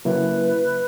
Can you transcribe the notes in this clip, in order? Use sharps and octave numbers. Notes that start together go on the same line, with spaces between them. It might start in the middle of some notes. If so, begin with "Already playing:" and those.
C#3 F#3 A#3 E4 B4